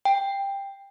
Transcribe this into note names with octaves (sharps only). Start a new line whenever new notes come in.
G5